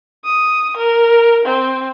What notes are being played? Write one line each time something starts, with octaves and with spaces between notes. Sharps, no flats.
D#6
A#4
C4